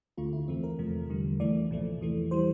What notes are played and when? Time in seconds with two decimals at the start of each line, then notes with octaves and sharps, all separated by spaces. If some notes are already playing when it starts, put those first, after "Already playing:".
0.17 D2 D3 A3 F4
0.33 E4
0.48 F2 E3 A3 C4
0.63 A#4
0.79 E2 C3 F3 A3
1.09 E2 D3 G3
1.40 F2 E3 A3 D5
1.70 C2 A#2 F3 A3
2.01 E2 E3 A3
2.31 E3 G3 C5